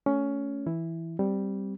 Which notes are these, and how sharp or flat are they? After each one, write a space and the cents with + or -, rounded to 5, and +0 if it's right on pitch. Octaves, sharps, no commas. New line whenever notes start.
A3 +0 C#4 +15
E3 +0 E4 +0
G3 +0 C4 +0